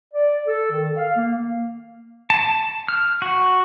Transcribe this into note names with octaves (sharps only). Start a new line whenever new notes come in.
D5
A4
D#3
F5
A#3
A5
F6
F#4